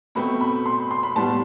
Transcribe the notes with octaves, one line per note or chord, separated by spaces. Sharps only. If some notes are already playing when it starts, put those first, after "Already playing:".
B2 A3 C4 B5
B5
C6
C6
B5
A2 G3 B3 A5